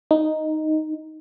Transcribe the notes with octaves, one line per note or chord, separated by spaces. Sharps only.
D#4